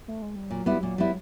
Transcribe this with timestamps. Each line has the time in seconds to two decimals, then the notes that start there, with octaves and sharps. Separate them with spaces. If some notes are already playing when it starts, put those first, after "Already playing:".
0.08 A3
0.22 G#3
0.36 G3
0.49 A#2 F#3
0.66 G3 B3 E4
0.83 A#2
0.98 G3 B3 E4